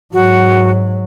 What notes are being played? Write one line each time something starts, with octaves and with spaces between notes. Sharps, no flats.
G#2 F#3 F#4